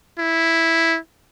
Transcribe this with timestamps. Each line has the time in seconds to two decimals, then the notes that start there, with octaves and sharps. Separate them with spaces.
0.18 E4